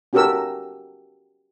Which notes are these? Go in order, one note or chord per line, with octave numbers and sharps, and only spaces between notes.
C#4 F#4 G4 A4 A#4 E6